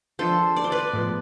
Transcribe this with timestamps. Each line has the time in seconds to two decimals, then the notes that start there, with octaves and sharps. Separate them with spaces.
0.19 F3 G#3 D4 F4 A4 C5
0.56 D5
0.64 C5
0.72 B4 D5
0.93 A2 F3 G#3 B3